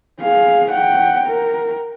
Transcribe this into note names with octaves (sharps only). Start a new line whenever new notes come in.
G#4 F5
F#5 G5
A#4